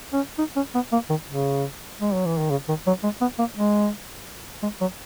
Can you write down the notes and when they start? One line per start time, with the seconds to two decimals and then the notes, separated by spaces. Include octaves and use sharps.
0.13 C#4
0.38 D#4
0.56 C#4
0.74 B3
0.92 A#3
1.09 D#3
1.28 C#3
2.00 G#3
2.13 F#3
2.26 E3
2.38 D#3
2.51 C#3
2.68 D#3
2.87 F#3
3.03 G#3
3.21 B3
3.39 A#3
3.57 G#3
4.63 G#3
4.81 F#3